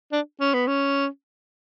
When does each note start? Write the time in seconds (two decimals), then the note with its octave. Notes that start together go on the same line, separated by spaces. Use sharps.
0.13 D4
0.40 C#4
0.54 B3
0.67 C#4